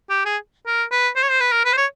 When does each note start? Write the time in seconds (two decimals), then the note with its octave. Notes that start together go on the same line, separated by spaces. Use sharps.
0.10 G4
0.25 G#4
0.66 A#4
0.91 B4
1.16 C5
1.23 C#5
1.30 C5
1.40 B4
1.52 A#4
1.65 B4
1.73 C5
1.77 C#5